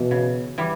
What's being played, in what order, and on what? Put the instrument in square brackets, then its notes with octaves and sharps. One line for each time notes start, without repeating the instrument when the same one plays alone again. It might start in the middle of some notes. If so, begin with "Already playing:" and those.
Already playing: [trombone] B2 [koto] E3
[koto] C#3
E3 G3